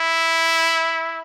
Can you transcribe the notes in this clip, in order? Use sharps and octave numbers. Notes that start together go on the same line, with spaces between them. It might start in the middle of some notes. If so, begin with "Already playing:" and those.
Already playing: E4